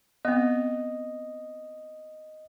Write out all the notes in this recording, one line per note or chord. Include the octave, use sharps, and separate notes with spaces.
B3 C4 D#5